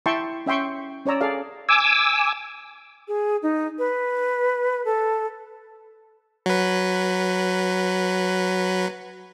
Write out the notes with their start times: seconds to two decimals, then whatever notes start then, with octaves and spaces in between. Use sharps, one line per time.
0.06 E4 E5 G5 A5 C6 C#6
0.46 C#4 E5 G5 C6 C#6
1.06 C#4 C#5 D5 A#5 E6
1.21 G#4 A4 D5 F5
1.69 G#5 D6 E6
3.08 G#4
3.43 D#4
3.78 B4
4.85 A4
6.46 F#3 B4